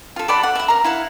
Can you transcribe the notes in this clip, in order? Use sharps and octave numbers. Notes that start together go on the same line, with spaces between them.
F4 A4
A4 D5 F#5 B5
F#5
E5 F#5
A#4 A#5
E4 F5 F#5